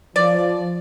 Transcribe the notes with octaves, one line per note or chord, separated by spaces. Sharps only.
F3 D5